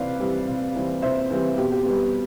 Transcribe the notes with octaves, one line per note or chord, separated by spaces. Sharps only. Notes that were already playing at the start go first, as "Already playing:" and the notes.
Already playing: C3 E3 C4 B4 D5 F5
E3 G3 C4
C3
E3 G3 C4
C3 C5 E5
E3 G3 C4
B2 G4
G4
G3 B3